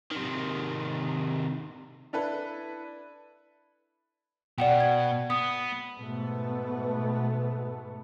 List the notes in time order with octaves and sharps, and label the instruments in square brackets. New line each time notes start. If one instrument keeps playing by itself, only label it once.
[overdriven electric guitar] C3 D#3
[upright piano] D4 E4 A4 B4
[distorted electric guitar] B2 [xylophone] D5 F#5 G5
[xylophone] G#6
[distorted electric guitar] B3 [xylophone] D#6
[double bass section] G#2 B2 A3 B3